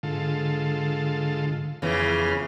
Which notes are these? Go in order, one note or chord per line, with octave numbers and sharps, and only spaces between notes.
G#2 D3 F4 A4
F2 C#3 E3 B3 F6